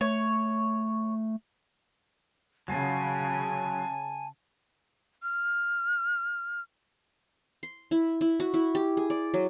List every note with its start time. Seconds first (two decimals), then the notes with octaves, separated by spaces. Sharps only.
0.01 A3 C#5
2.68 C#3 F#3 F4 G#5 A5
5.23 F6
7.63 C6
7.91 E4
8.21 E4
8.40 F#4
8.54 E4
8.75 G4
8.97 G#4
9.10 D5
9.34 F#3